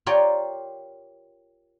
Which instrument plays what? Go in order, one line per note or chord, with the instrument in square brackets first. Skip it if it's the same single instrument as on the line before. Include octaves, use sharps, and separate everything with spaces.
[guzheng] F4 G4 A#4 C#5 D5 G5